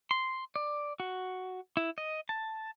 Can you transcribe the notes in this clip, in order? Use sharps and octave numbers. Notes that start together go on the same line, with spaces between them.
C6
D5
F#4
E4
D#5
A5